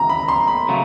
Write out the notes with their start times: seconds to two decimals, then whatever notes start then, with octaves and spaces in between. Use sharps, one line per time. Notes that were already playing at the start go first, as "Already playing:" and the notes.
Already playing: F#2 C#3 E3 A#5
0.09 B5
0.28 C6
0.47 B5
0.68 C#3 F#3 A3